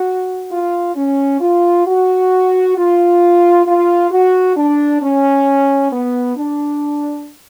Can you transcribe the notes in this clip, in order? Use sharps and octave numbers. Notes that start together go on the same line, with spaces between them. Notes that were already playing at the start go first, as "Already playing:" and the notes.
Already playing: F#4
F4
C#4
F4
F#4
F4
F4
F#4
D4
C#4
B3
D4